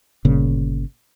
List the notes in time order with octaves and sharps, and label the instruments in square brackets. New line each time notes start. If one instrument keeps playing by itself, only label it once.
[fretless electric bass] G1 A#2 C#3